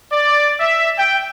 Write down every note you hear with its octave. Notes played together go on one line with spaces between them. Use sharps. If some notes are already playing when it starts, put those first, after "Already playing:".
D5
E5
G5